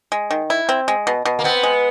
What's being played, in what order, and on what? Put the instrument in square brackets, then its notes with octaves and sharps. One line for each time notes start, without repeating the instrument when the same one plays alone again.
[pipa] G#3
D#3
E4
C4
G#3
B2
B2
[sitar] A#3
[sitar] B3 [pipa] C4
[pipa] G#3